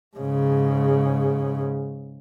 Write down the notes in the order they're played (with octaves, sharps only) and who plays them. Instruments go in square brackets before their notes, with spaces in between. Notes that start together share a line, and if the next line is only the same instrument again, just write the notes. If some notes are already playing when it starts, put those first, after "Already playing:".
[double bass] G#2 C#3